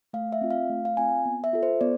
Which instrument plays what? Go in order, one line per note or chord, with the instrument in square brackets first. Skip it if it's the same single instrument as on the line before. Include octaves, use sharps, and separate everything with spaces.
[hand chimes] A3 F5
E5
C4 F4
F5
A3
F5
C4 F4 G#5
B3
E5
F4 A4
C5
B3 D5